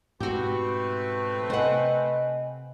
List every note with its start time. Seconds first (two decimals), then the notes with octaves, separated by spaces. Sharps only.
0.20 G#2 B2 E3 A3 C4 F#4 G4 B4
1.50 C3 C5 D#5 F#5 G#5